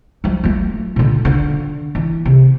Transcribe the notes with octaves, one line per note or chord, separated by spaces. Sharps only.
F3 F#3
F#3 A3
A#2 D3
D3
E3
C3